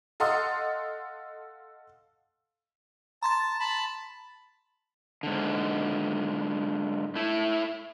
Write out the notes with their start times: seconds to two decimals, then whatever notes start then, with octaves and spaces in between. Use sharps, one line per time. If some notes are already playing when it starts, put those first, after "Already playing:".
0.20 A4 D#5 F5 F#5 C6 D#6
3.23 A5 A#5 C6 A6
3.60 A5 B5
5.23 G#2 D3
7.15 A3 E4